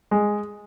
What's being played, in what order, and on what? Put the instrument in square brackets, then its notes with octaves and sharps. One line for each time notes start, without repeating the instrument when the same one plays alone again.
[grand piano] G#3